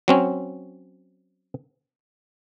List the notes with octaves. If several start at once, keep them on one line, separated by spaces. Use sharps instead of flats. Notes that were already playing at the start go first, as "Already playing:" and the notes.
F#3 C4 C#4